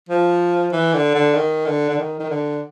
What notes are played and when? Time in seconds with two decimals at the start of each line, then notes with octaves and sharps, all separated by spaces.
0.09 F3
0.72 E3
0.93 D3
1.14 D3
1.35 D#3
1.66 D3
1.89 D3
1.98 D#3
2.19 D#3
2.30 D3